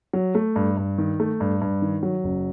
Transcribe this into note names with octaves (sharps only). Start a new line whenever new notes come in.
F#3
A3
G2
G2
D#3
A3
G2
G2
D#3
F#3
F#1